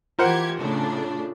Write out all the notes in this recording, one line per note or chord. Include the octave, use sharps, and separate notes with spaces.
E3 F4 G4 A#4 C5 F#5 G#6
A2 C#3 D4